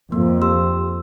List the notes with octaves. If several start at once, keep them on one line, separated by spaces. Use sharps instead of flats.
F2 A#3
G4 C6 E6